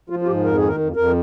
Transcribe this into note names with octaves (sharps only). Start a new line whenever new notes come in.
F3 F4
F4
G#2 G4
F2 A#4
G#4
D#3
A#4
F2
F2 A#4